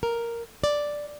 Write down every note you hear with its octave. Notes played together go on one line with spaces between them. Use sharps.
A#4
D5